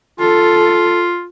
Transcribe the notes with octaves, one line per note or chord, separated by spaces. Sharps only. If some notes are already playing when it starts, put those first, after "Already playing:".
F4 A4